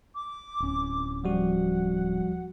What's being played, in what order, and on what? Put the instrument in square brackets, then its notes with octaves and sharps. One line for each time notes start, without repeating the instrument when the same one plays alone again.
[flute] D6
[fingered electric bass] D1 C#4
[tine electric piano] F3 G3 F#4 [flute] F#5